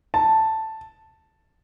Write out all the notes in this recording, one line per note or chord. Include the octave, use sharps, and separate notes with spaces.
A5